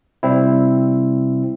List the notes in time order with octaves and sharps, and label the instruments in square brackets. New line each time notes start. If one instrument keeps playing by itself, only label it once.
[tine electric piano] C3 G3 C4 E4